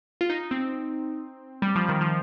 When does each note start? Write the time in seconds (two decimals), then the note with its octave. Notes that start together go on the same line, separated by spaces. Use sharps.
0.21 F4
0.30 D#4
0.51 C4
1.62 G3
1.75 F3
1.89 D#3
2.01 F3